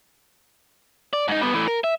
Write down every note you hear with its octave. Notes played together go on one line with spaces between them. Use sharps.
D5
G#2 D#4
G3 B3
E3 A3
A#4
E5